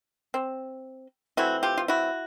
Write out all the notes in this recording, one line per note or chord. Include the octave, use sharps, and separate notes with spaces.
C4
E3 A3 C4 E4 F#4
F4 G4
F4
E4 F#4